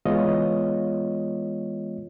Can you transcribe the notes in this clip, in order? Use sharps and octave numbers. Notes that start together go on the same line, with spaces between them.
E3 G#3 B3 F4 C#5 D#5